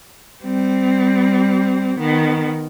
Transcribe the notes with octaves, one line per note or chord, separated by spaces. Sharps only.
G3 C4
D#3 B3